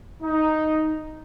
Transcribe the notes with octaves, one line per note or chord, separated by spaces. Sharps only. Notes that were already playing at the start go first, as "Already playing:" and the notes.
D#4